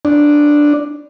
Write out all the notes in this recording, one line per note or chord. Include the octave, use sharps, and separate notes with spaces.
D4